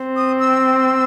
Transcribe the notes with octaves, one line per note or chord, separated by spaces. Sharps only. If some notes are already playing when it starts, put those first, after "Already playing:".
Already playing: C4
D#6
E6